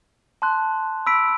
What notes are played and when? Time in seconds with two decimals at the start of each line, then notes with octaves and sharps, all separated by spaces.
0.42 A5 C6 F#6
1.06 B5 E6 B6 D7